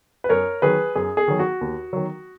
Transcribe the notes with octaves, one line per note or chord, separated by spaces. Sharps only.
B4
F#2 A#4 C#5
D#3 F#3 G#4 B4
F#2 G#4
G#4
D#3 F#3
F#4
D#2
D#3 F#3